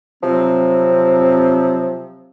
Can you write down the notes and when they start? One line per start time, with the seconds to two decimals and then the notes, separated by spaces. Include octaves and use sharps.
0.22 C3 F3 F#3 C4